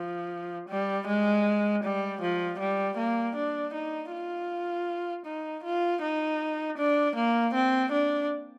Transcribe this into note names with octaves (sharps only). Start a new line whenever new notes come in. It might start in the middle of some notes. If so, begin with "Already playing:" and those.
Already playing: F3
G3
G#3
G3
F3
G3
A#3
D4
D#4
F4
D#4
F4
D#4
D4
A#3
C4
D4